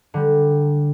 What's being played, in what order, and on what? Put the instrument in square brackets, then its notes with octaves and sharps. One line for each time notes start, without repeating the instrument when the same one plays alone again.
[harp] D3 G3